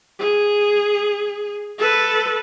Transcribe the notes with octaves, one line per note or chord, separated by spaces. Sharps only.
G#4
A4 B4